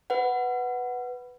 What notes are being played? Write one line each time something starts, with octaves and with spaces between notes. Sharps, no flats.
B4 F#5